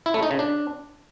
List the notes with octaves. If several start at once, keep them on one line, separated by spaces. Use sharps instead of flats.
E4
A3
D#4
C#3
D4